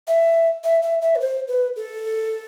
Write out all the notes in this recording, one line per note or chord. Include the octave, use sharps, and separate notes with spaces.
E5
E5
E5
E5
B4
C5
B4
A4